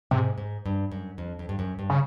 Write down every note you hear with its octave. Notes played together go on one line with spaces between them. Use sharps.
G#2 C3
G#2
G2
F#2
F2
F2
G2
F#2
G2
C#3